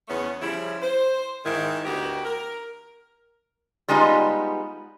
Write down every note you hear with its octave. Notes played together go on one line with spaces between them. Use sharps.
E2 C#3 A3 B3 C#4
C#3 F3 G3 E4
C5
G#2 D#3 E4
D2 B3 D#4 F#4 G4 A#4
A#4
G3 G#3 B3 D#4 F4